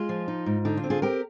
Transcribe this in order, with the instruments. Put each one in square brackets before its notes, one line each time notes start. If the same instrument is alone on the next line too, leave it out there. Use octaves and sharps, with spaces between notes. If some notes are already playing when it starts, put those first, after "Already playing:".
Already playing: [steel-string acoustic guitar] G#3 F4
F3
D#4
G#2
D3 D#4
F4
C4
F4 G#4
C4 G4 A#4